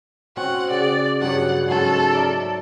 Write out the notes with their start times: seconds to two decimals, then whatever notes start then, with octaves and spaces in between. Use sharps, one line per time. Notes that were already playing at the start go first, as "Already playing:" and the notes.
0.37 C4 C#4 F#4 F#5
0.70 C#3 D5
1.21 G2 C#3 F#3 F#5
1.68 G#2 F#3 C#4 A4
2.12 A#4 D5 E5